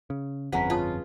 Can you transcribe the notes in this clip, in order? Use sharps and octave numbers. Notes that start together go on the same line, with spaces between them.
C#3
G1 F2 G#3 C#4 B4 F#5 A#5 B6
F4 C#5 A5 D#6